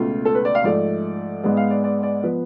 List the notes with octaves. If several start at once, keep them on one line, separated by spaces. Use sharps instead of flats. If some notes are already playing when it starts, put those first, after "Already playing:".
Already playing: C#2 B2 A3 F4
A4
B4
D5
F5
G#2 F3 A3 D5
G#2 G#3 B3 D5
F5
D5
D5
D5
F3 B3 B4